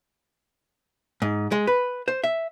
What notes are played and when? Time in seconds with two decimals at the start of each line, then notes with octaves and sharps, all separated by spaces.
1.22 G#2
1.52 G#3
1.67 B4
2.08 C5
2.24 E5